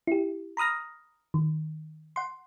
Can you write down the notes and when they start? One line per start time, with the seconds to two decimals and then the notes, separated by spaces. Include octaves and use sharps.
0.07 E4 G4
0.57 A#5 B5 D#6 F6 A#6
1.34 D#3
2.16 F#5 C6